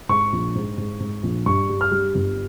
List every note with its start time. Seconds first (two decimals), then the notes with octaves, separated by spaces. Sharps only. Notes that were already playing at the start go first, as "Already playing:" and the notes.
0.09 G#2 C#6
0.33 A#1
0.55 G#2
0.78 G#2
1.00 G#2
1.23 A#1
1.46 G2 C#6
1.69 G3
1.81 F6
1.91 G3
2.15 G1